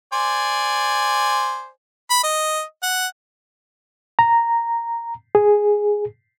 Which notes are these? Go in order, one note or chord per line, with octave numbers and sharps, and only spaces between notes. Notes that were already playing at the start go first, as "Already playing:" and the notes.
C5 D5 G#5
B5
D#5
F#5
A#5
G#4